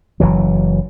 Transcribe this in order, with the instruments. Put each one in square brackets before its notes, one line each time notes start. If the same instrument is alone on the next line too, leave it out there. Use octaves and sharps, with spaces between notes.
[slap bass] F#1 E3 F#3